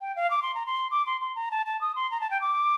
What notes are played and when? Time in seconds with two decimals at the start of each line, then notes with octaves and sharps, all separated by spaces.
0.01 G5
0.16 F5
0.31 D6
0.43 C6
0.55 A#5
0.66 C6
0.91 D6
1.06 C6
1.21 C6
1.35 A#5
1.51 A5
1.66 A5
1.81 D#6
1.96 C6
2.11 A#5
2.21 A5
2.31 G5
2.41 D6